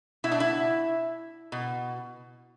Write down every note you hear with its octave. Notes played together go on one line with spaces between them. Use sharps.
B2 E4
D4
E4
B2